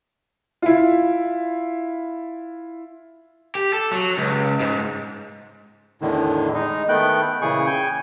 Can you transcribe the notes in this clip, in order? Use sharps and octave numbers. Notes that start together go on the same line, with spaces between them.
E4 F4
G4
A4
F#3
C#2
G#2
E2 A2 D3 D#3
G#3 D#4
D#3 A3 B3 G5 F#6
A#2 C#3 E3 G#4 C#6
G5 G#5